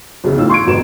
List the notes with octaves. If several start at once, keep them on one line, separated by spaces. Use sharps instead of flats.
B1 C#3 E4
A1 D#4 F4 E6
C6 C#6 G#6 D7
G#1 F2 B2 B4 A#5 E7